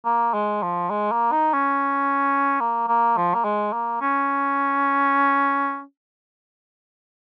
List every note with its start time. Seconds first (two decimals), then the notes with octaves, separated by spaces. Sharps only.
0.05 A#3
0.34 G#3
0.62 F3
0.90 G#3
1.12 A#3
1.32 D#4
1.54 C#4
2.60 A#3
2.88 A#3
3.17 F3
3.34 A#3
3.44 G#3
3.73 A#3
4.01 C#4